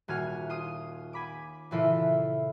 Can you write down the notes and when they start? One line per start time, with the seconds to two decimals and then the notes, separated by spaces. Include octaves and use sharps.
0.08 D#1 F#4 G#5 F6
0.49 F4 D#6
1.13 G#5 B5 D6
1.71 A#2 C#3 E3 E4 F4 A4